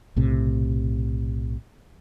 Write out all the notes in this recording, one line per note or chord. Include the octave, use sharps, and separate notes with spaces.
B1 A2 C3